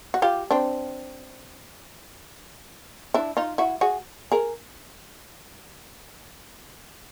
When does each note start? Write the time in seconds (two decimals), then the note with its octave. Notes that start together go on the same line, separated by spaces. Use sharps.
0.14 F#4
0.22 F4 G4
0.51 C4 D4
3.14 D4 E4
3.37 D#4 F4
3.58 E4 F#4
3.81 F#4 G#4
4.32 G#4 A#4